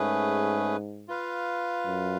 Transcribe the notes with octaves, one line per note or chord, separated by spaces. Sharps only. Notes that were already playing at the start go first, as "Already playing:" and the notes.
Already playing: G#2 A3 C#4 G#4 B4
F4 B4 F5
F#2